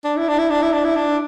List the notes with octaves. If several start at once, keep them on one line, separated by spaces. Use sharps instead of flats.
D4
E4
D4
E4
D4
E4
D4
E4
D4